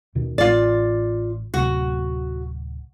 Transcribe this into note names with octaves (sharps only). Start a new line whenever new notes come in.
D#2 B2 D#3
A1 F4 D5
D1 C3 F#4